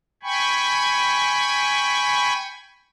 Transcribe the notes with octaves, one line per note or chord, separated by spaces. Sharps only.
G5 G#5 B5 C#6